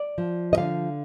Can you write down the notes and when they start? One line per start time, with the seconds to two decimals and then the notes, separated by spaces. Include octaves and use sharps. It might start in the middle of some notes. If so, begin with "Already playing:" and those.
Already playing: D5
0.18 F3
0.53 D#5
0.57 D3 F5